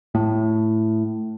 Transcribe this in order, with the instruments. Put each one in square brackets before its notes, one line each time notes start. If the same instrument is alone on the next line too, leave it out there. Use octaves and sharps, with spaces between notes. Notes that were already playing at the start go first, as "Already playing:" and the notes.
[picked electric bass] A2